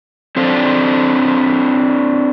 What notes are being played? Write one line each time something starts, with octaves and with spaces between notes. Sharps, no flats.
C4 D4 A4 C5